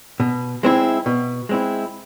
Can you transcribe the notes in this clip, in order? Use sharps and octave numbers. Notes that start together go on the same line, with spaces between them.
B2
G#3 C4 E4
B2
G#3 C4 E4